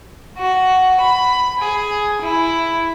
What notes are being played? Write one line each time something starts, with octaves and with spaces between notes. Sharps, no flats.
F#4
B5
G#4
E4